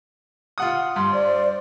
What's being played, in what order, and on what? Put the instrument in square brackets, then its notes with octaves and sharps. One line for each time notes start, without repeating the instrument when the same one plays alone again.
[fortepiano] F4 F#5 D#6
[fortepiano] G2 [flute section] C6
[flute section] C5 D5